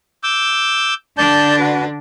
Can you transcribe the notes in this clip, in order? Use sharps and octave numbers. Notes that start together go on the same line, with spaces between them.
D6 E6 G6
D3 D4 D5 A5 G6
F#4 B4